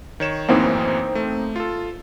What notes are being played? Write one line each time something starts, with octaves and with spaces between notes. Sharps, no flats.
D#3 C#5 E7
F#2 A2 E3 A#3 C4 D#4
A3
F4 A4